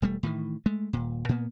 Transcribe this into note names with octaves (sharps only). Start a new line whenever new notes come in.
E1 G3 A3
A2 D#3 E3
G#3 A3
D#1 A#2
A#2 A#3 B3